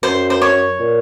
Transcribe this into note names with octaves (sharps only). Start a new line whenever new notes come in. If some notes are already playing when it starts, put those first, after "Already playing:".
F#2 C5
C5
C#5
A#2